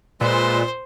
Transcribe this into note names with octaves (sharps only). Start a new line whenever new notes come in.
A#2 G#3 B4 C5 E6